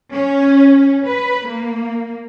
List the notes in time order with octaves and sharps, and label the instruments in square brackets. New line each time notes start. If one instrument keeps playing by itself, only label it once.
[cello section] C#4
B4
A#3